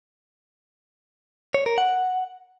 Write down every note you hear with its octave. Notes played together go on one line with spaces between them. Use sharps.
C#5
A#4
F#5